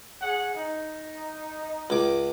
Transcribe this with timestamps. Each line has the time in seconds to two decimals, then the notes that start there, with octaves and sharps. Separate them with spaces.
0.21 G#4 C#5 F#5
0.55 D#4
1.90 C#2 D6